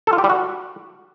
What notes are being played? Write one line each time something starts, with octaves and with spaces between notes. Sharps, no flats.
A4
F4
G4
G3
F#4